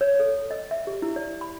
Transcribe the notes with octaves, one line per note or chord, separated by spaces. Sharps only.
C#5
A4
D#5
E5
G4
E4
D5
B5